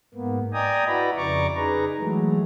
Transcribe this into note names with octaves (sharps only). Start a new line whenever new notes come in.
G#2 A#3 B3
D5 D#5 G5 G#5 A#5 D#6
E4 F#4 B4 D5 A#5 B5
F2 C#3 D5 A#5 C#6 D6
D#4 G#4 B4 A#5
E3 F#3 G#3 A3